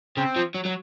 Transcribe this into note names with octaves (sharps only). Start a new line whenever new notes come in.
C#3 C4
F3
F#3
F#3